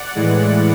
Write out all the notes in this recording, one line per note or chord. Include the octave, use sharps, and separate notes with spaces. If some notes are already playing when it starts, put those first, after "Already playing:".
Already playing: D5 F#5
A2 E3 G#3